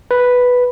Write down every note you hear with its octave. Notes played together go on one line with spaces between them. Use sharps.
B4